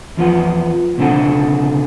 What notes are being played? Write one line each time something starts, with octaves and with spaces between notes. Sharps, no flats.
E2 F3 B3 F#5
C#2 B2 D3 C4 A4 F#5